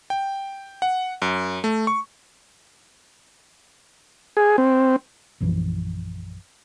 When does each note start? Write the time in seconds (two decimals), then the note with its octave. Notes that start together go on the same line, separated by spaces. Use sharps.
0.10 G5
0.82 F#5
1.22 F#2
1.64 A3
1.87 C#6
4.37 G#4
4.58 C4
5.40 A#1 F#2 E3 F3